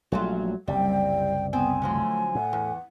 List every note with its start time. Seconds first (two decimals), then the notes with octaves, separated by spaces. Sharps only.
0.12 A#1 F#3 G3 A3 F4
0.68 F#1 C2 C3 G3 G5
1.53 B3 C4 G#5
1.82 D3 F3 F#3 A3
2.35 A2 F#5
2.53 E2